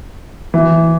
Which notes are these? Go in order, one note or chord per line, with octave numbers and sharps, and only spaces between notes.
E3